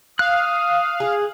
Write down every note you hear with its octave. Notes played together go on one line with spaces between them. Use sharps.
F5 D#6 F#6
G#4